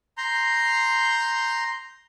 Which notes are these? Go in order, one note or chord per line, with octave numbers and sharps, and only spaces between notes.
A#5 C6 G6